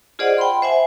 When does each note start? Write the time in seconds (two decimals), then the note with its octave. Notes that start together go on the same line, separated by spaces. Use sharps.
0.19 F4 G#4 C5 D5 D#5 F#5
0.38 G5 B5 C6
0.62 C5 E5 F#5 G#5